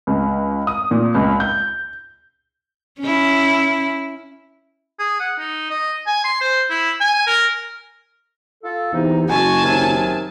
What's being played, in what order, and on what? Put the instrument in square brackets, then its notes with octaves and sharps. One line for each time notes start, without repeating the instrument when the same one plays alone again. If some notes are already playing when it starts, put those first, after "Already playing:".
[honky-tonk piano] C#2
D#6
A#2
C#2
G6
[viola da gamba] C#4 E4
[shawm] G#4
F#5
D#4
D#5
G#5
C6
C5
E4
G#5
A#4
[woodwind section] F4 A4
[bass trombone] E2 [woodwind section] C3 D#4
[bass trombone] F#1 [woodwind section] G#3 F#4 [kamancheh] G#5 A5
[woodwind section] C3 D#3 F#3